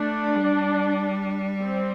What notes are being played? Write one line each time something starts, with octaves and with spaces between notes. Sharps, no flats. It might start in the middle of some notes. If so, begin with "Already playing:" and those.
Already playing: A3 D4
G3
C4